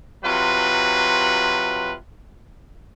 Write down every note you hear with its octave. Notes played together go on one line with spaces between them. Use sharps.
C3 F#3 F4 B4